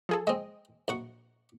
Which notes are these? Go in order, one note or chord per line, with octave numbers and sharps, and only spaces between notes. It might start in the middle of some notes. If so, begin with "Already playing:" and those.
F3 G#4 A4
G#3 C4 D#5
A#1 F#4 C#6